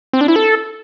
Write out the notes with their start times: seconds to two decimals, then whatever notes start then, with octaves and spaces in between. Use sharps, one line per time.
0.13 C4
0.21 D4
0.28 E4
0.36 A4